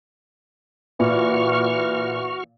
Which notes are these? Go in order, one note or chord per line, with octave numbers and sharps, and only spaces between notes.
A#2 E3 F#4 C#6 F6